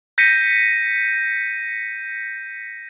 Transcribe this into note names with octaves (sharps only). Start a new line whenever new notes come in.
G6 A#6 B6 C#7 D#7